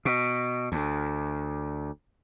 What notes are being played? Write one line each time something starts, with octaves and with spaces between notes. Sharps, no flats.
B2
D2